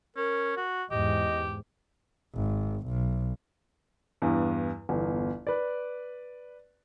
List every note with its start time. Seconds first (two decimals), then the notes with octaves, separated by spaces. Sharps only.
0.17 C#4 A#4
0.57 F#4
0.91 E2 G#2 G4 D#5
2.35 G#1
2.88 B1
4.22 E2 G2
4.89 G1 E2
5.47 B4 D5